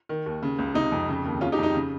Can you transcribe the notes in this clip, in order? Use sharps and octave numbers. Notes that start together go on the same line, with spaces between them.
D#3
D#2
C#3
C#2
C3 D#4
F2
C#3
D#2
C#3 C#4 F4
D#4 G4
F2
D#4 G4
C#3